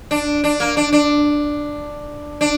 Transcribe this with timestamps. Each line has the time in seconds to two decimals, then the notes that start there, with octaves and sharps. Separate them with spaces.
0.11 D4
0.44 D4
0.60 A#3
0.77 D4
0.93 D4
2.41 D4